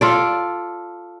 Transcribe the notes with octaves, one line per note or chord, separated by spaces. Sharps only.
F4 A4 D5